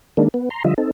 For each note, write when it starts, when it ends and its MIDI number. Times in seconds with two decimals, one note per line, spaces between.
0.17 0.28 51
0.17 0.28 56
0.17 0.28 58
0.17 0.28 62
0.34 0.49 59
0.50 0.63 82
0.50 0.63 84
0.64 0.74 50
0.64 0.74 53
0.64 0.74 55
0.64 0.74 65
0.64 0.74 75
0.64 0.74 76
0.78 0.91 60
0.78 0.91 63
0.78 0.91 69